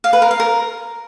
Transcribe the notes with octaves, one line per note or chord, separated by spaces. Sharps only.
F5
B4
A#4
F5
A#4